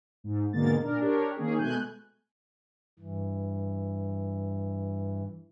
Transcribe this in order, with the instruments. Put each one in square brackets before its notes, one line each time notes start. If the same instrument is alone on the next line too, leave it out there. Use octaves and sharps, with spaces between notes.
[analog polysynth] G#2
G#2 B2 D3 G#3 A#3 A6
A#2 D4 A#4
D4 G4 A#4 C#5
D#3 A#3 C#4 G#4
B2 G#3 A3 G#5 F#6 G6
[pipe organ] G2 E3